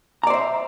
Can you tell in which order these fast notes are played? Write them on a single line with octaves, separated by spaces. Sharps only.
A#5 D5 C5 E5